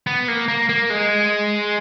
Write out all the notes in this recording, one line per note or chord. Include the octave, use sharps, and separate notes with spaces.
B3
A#3
A#3
A#3
G#3